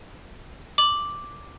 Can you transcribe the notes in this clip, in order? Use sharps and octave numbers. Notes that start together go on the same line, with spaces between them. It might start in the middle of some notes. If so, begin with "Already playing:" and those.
D6 F#7